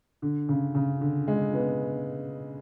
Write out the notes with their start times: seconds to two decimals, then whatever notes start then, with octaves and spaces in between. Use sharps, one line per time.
0.22 D3
0.49 C#3
0.75 C#3
1.01 D3
1.28 G#3
1.54 B3